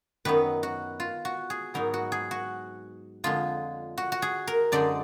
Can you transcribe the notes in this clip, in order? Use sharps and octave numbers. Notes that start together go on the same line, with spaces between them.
F#2 D#3 F#3 B3 D#4 B4
F#4
F4
F#4
G#4
G#2 F#3 B3 D#4 A#4
F#4
G#4
F#4
F2 D3 G#3 F4
F#4
F#4
G#4
A#4
F#2 D3 G#3 D#4 D5